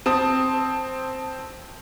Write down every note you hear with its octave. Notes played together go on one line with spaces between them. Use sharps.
C4 A5 D#6